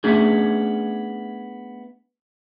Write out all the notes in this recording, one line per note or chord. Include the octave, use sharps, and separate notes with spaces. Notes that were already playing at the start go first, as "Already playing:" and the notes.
A3 B3 C#4 D4 G#4